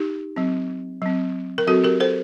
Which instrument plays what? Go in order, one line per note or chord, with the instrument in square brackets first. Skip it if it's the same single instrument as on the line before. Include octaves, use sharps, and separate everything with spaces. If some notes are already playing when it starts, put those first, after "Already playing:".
Already playing: [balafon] D#4 G4
F#3 C4
F#3 C4
A#4
F#3 C4 F#4 A4
G4 A#4
A4 C5